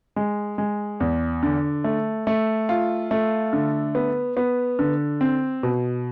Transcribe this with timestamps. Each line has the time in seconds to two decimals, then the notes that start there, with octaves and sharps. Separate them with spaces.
0.16 G#3
0.58 G#3
1.00 E2
1.43 D3
1.84 A3
2.27 A3
2.69 F4
3.11 A3
3.53 D3
3.95 B3
4.37 B3
4.79 D3
5.21 C4
5.63 B2